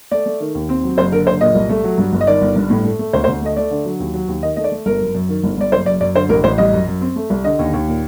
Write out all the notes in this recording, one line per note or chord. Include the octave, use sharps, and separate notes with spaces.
A3 D5
A3
D#3
D#2
C4
F#3
F#1 C5
D3 A#4
F#1 C5
A#2 D#5
C2
A3
F#3
G2
G1
D#5
D#3 D5
G1
G2
A2
A3
A3
D2 C5
C5
D2
A3 D#5
A3 D5
D3
F#3
D#2
F#3
D#2
D#3 D#5
A3 D#5
D5
A3
G1 A#4
F#2
F#2
D#3
G1
G1 D5
F#1 C5
F#2 D5
F#2 D5
D3 C5
A1 A#4
A1 C5
G3 D#5
F#2
F#2
C4
A3
C2
D3 D#5
D#2
D#2
A#2